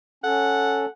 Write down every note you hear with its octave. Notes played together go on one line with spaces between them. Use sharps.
C#4 A4 F#5